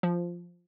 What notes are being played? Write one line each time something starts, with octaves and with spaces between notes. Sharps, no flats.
F3